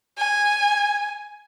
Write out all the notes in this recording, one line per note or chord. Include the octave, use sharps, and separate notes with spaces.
G#5